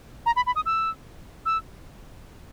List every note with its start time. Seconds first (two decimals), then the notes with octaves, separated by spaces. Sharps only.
0.26 A#5
0.36 B5
0.46 B5
0.56 D#6
0.66 E6
1.46 E6